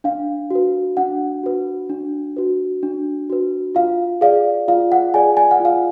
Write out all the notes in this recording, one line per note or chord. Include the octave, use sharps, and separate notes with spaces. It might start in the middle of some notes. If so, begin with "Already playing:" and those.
D4 F5
F#4 B4
D4 F#5
F#4 B4
D4
F#4 B4
D4
F#4 B4
F4 F5
G#4 D5 F5
F4 F5
F#5
G#4 D5 G#5
G#5
F#5
F4 F5